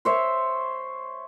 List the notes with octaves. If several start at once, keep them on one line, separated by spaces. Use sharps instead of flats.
C5 C#5 E5